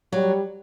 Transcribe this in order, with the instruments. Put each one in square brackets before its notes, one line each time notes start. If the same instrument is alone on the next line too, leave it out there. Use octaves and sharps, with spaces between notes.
[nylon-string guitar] F#3 [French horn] G3